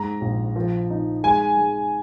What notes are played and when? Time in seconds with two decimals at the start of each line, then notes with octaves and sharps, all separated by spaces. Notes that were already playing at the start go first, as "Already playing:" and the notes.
Already playing: G#2 A#5
0.21 A#1
0.56 F3
0.90 D#4
1.23 G#3 G#5
1.57 G#3